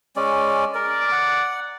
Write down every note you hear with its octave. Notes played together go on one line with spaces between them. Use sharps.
G#3 C#4 D5
A#4 D5
F#5